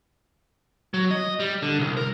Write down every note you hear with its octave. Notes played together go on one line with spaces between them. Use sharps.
F#3
D#5
G3
D3
C2
A#4